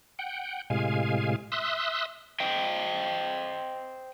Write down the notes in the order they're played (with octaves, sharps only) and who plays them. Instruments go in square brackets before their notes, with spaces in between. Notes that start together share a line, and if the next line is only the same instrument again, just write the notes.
[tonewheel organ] F#5 G5
A2 C3 G#3 F5 G#5
E5 C6 D#6 E6 F#6
[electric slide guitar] C5 D#5 G5